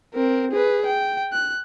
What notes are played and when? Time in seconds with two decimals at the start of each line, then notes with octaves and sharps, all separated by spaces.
0.14 C4 A#4
0.51 G#4 B4
0.86 G5
1.33 F#6